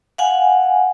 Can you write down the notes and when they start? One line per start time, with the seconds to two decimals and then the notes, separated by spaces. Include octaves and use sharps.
0.18 F5 F#5 G#5